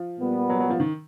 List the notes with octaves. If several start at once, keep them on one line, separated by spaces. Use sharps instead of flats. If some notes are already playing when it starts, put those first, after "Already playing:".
Already playing: F3
A#2 G3 B3
F#3
F#3
F3
D#3